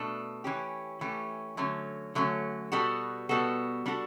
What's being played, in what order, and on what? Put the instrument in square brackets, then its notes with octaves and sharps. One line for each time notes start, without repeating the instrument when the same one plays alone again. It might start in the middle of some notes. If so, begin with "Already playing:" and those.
Already playing: [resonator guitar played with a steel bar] B2 A3 D4 A4
E3 A3 C#4 G4
E3 A3 C#4 G4
D3 F#3 A3 C#4
D3 F#3 A3 C#4
B2 G3 B3 F#4 A4
B2 G3 B3 F#4 A4
G3 D4 F#4 A4